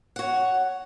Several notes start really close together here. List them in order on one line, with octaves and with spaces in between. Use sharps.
F#5 F#4 C#5